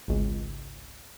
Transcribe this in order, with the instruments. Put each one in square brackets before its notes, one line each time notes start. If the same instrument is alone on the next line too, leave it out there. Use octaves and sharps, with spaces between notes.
[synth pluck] G#1 C#2